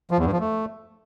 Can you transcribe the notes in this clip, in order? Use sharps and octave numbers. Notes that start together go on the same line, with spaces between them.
F3
E2
G2
F3
A3